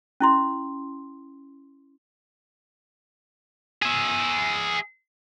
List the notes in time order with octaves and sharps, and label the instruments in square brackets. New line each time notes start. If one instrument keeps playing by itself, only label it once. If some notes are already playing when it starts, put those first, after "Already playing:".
[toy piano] C#4 E4 C6
[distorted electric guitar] G#4 E5